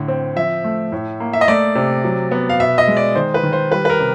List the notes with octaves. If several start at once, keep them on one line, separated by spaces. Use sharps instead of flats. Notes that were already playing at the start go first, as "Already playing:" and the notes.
Already playing: A2 D3
C4
F3 E5
A3
A2
A#3
E5
D#5
A3 D5
C3
F#3
B3
F5
B2 E5
D#5
G#3
D5
D#3 C5
B4
D#3
C5
G3 B4
B4
A#4
C3